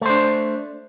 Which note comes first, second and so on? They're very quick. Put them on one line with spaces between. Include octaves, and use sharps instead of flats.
A3 C5 D4